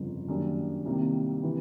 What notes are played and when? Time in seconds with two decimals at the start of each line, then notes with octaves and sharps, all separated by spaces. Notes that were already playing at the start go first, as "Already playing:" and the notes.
Already playing: G1 F2 C#3
0.28 F#2 D#3 G3 A#3 D4
0.85 C2 C3 D#3 G3 A#3
1.43 C3 E3